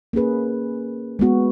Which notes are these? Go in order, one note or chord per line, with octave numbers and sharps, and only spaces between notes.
A#3 C#4 G#4 B4
G#3 B3 F#4